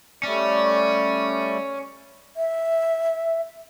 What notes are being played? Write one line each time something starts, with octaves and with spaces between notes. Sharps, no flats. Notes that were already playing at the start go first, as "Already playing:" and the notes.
G3 A3 C#4 D5
E5